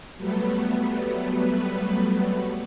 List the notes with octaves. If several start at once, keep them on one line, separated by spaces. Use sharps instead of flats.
F#3 G3 A3 B3 B4